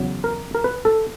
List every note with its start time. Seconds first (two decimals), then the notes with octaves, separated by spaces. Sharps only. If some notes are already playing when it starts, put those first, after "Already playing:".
Already playing: E2 C#3 F#3
0.24 A#4
0.55 A#4
0.64 B4
0.85 A4